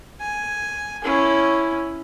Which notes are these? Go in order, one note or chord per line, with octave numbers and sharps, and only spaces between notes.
G#5
C#4 E4